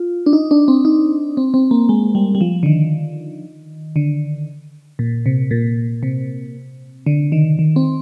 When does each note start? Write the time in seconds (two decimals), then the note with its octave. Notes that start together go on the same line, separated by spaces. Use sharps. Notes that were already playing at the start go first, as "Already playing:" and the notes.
Already playing: F4
0.26 D4
0.33 D#4
0.51 D4
0.68 C4
0.85 D#4
1.37 C4
1.54 C4
1.71 A#3
1.89 G#3
2.15 G3
2.35 G3
2.41 F3
2.63 D3
2.66 D#3
3.96 D3
4.99 A#2
5.26 C3
5.51 A#2
6.03 C3
7.06 D3
7.32 D#3
7.59 D#3
7.76 C4